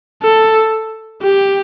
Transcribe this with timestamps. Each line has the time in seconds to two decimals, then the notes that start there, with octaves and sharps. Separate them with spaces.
0.22 A4
1.23 G4